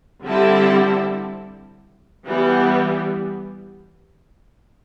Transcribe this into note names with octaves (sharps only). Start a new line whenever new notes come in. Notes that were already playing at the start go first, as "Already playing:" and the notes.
D3 G3 C4 E4 A4
E3 G3 B3